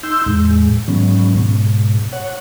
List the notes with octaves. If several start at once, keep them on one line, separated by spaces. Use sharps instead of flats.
D#4 C6 E6 G6
E2 A2 G#3
G#2 D#3 F#3 B3 C#4
G#2 B2
C#5 F#5